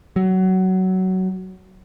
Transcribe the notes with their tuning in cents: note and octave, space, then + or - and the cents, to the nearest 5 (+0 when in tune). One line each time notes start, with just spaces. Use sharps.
F#3 +15